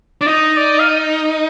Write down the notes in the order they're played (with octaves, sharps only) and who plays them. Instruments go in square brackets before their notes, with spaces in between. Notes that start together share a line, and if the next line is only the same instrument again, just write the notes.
[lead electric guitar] D4 [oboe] D5
[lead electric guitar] D#4 [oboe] D#5
[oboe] D5
F5